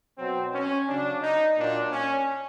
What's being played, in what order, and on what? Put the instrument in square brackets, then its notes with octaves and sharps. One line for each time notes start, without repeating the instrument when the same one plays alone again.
[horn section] B2 F#3 C4
C#4
C#3 F#3 D4
D#4
A#2 F#3 D4
C#4